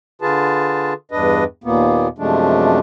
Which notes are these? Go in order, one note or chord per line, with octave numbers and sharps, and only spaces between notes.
D3 F4 G#4 B4 A5
E2 G2 D4 B4 D#5
D#2 A#2 A#3 B3
F#2 C3 F3 G#3 A3 D4